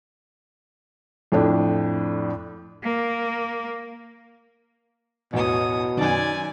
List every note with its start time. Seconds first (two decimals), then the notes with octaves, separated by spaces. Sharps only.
1.32 F2 A2 D4
2.83 A#3
5.33 A1 E2 B2 C#5 D#6
5.97 F#2 D#3 D5 G#5